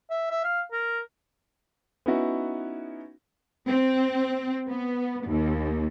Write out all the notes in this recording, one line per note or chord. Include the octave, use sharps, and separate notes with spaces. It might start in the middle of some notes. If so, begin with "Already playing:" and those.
E5
E5
F5
A#4
B3 C#4 D#4 E4 F#4
C4
B3
D#2